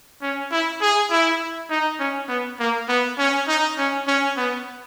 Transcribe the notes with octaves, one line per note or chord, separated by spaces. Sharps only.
C#4
E4
G#4
E4
D#4
C#4
B3
A#3
B3
C#4
D#4
C#4
C#4
B3